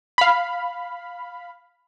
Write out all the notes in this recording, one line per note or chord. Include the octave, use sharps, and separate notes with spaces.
F5 B5